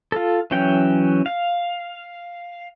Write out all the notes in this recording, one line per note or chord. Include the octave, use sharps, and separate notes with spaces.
F4 A4
E3 F#3 C#4 G5
F5